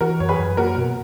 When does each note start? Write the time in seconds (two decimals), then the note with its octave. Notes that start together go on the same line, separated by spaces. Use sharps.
0.01 E3 F#4 A#4
0.20 F#2 C#5
0.29 G#4 B4
0.39 F#2
0.57 A#3 F#4 A#4
0.77 B2